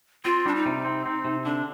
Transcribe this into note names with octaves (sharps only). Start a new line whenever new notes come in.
C4 F4
G3 D4
D#4
C3
C4
C4
C3
D3 D4